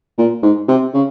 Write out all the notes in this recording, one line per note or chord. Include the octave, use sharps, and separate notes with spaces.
A#2
G#2
C3
C#3